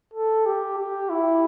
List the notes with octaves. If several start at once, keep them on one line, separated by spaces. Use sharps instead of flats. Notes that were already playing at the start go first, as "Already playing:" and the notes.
A4
G4
G4
E4